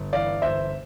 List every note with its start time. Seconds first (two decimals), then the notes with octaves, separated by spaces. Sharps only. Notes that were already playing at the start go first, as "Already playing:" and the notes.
Already playing: G1
0.13 E3 D5 F5
0.42 G1 C5 E5